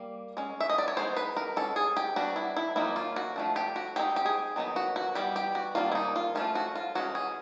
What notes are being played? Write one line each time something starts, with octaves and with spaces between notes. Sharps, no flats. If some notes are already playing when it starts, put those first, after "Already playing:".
Already playing: G3 A#3
G#3 C#4
E5
D#5
D5
C#5
E3 G#3 B3 D#4 C5
B4
A#4
G#3 C#4 A4
G#4
G4
G3 B3 D4 F#4
E4
E4
D#3 F#3 A#3 D#4 E4
F4
F#4
F3 A3 D4
G4
F#4
G#3 C4 D#4 G4
G4
G#4
D#3 F#3 B3 D#4
F#4
F#4
E3 G3 B3 G4
G4
F#4
D#3 G3 A#3 D4 F4
E4
D#4
F4
F3 A3 C#4 F4
F#4
F4
E3 G#3 C#4 F#4
G#4